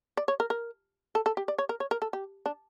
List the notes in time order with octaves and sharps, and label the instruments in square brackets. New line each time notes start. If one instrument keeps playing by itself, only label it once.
[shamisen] D5
C#5
A#4
A#4
A4
A4
G4
D5
C#5
A#4
C#5
A#4
A4
G4
D4